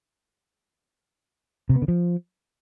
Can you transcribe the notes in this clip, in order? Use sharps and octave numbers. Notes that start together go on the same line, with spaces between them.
C3
B3
D3
F3